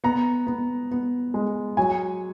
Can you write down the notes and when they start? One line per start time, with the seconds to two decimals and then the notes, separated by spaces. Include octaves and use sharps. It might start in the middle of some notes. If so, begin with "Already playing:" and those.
0.04 B3 A#5
0.47 B3
0.91 B3
1.34 G#3
1.77 F#3 G#5